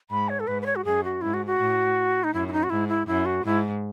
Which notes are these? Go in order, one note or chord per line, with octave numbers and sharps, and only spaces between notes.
G#2 B5
C#5
A4
G#2 B4
B4
C#5
F#4
F#2 G#4
F#4
G#2 E4
F#4
F#4
A2
D#4
F#2 E4
E4
D#4
F#4
G#2 E4
E4
F#2 E4
F#4
G#2 E4